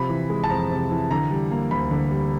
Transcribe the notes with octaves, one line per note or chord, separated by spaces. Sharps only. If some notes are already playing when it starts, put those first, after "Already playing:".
Already playing: C3 F3 B5
E3
G#3
A5
F2 A#5
C3
E3
D3 A#5
G3
A#3
D2 B5
D3
G3